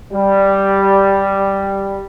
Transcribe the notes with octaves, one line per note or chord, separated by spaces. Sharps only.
G3